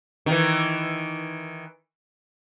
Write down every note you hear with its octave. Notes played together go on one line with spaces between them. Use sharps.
D#3 E3